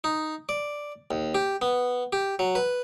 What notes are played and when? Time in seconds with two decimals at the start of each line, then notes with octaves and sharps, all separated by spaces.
0.04 D#4
0.49 D5
1.11 D#2
1.35 G4
1.62 B3
2.13 G4
2.39 F#3
2.55 B4